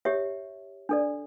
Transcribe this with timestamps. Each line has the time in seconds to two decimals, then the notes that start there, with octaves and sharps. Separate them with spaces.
0.05 G4 C#5 E5
0.89 D4 A4 D5